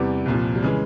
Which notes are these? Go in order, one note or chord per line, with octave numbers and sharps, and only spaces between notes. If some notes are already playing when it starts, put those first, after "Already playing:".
Already playing: E2 C3 E3 G3
C2 A#2 F3
G3
C#3 E3 G#3